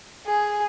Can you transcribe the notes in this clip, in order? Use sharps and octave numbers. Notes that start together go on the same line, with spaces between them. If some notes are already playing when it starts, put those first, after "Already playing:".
G#4